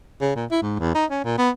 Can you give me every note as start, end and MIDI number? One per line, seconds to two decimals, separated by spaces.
0.21 0.32 49
0.35 0.45 46
0.51 0.60 64
0.62 0.76 44
0.79 0.90 40
0.95 1.05 63
1.10 1.24 61
1.24 1.35 46
1.38 1.50 59